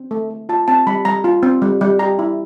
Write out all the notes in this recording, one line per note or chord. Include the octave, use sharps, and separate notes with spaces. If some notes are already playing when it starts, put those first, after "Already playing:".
Already playing: C4
A3
A3
F4 A5
C4 A5
G3 B5
G3 A#5
F4
C4
G3
G3
G4 A#5
E4